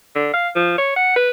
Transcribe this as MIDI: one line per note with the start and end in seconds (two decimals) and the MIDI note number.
0.16 0.30 50
0.33 0.49 77
0.56 0.76 53
0.78 0.93 73
0.96 1.16 78
1.16 1.31 71